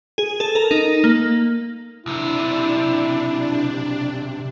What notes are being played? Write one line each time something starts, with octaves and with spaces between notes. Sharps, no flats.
G#4
A4
A#4
D#4
A#3
B1 C3 D4 E4